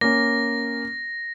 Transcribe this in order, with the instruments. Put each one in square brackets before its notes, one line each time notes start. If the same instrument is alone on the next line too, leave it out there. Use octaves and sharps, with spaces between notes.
[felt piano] A#3 C#4 [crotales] A#6